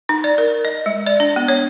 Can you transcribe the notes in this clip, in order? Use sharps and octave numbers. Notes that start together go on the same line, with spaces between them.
D#4
D5
A#4
D#5
G#3
D5
D4
B3
C#5